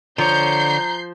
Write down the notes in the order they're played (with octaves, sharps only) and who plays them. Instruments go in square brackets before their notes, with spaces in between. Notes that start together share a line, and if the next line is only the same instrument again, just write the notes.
[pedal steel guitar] D3 C#5 [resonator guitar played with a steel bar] F3 [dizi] A#5 [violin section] G6 C7